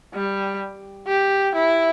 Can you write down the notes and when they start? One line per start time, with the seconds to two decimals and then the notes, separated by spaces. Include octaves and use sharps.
0.14 G3
1.08 G4
1.55 E4